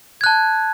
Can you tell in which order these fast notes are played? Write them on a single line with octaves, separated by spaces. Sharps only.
G#6 F#6 A5